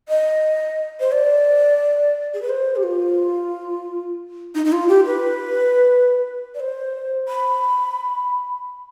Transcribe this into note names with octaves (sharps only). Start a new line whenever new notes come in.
D#5
C5
D5
G#4
B4
C5
G4
F4
D#4
D#4
F4
G4
B4
D5
C5
B5